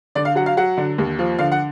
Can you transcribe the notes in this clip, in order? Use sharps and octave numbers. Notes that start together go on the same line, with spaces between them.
D3 D5
F5
F#3 F#5
F5
F#3 F#5
D3
D#2
F3
D3 F5
F#5